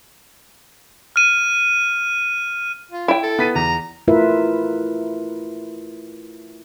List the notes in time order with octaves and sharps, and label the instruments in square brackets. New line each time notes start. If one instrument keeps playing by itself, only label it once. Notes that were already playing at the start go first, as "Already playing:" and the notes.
[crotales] F6 D#7
[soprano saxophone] F4
[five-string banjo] E4 G5
[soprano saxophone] A4
[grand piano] B3 B6 D#7
[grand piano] E2 [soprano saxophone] A#5
[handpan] A3 E4 F4 A#4 B4 E5